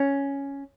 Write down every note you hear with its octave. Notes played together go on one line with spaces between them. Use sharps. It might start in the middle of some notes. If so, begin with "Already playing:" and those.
Already playing: C#4